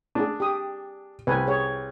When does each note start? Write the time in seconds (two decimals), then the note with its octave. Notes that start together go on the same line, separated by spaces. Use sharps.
0.15 D4 G#4
0.40 G4 D#6
1.27 C2 B4 G#5
1.47 G#4 C#5